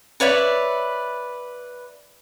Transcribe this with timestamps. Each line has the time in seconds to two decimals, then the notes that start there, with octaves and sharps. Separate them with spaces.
0.20 B4 C#5 D5 E5